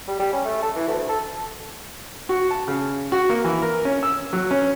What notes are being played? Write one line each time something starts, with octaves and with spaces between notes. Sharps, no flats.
G3
G3
C#4
A3
A4
E3
D2
A4
F#4
A5
C#3
F#4
A#3
E3
A#4
C#4
E6
F#3
C#4